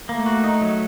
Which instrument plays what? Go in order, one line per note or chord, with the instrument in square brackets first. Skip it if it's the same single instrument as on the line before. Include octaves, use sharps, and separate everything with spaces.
[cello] A3 [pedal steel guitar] A#3
[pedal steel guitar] F#4
D#4
F#3